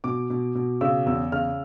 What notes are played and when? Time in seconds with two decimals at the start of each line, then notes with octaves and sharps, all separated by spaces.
0.04 B2 D6
0.30 B2
0.55 B2
0.81 C#3 E6
1.06 E2 E6
1.32 C#3 F6